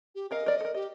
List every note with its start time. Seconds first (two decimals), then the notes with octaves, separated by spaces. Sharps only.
0.15 G4
0.31 C#4 A#4 D#5 F5
0.46 A#4 D5
0.61 A4 A#4
0.74 G4 D#5